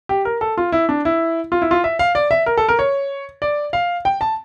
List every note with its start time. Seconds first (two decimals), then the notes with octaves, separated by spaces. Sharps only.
0.09 G4
0.25 A#4
0.41 A4
0.57 F4
0.72 E4
0.89 D4
1.05 E4
1.52 F4
1.62 E4
1.71 F4
1.84 E5
1.99 F5
2.15 D5
2.31 E5
2.46 A#4
2.57 A4
2.69 A#4
2.79 C#5
3.42 D5
3.73 F5
4.05 G5
4.21 A5